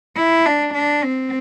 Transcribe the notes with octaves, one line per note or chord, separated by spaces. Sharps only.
E4
D4
D4
C4